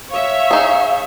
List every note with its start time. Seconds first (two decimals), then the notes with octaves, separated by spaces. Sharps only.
0.11 C#5 E5 F5
0.51 D#4 G#4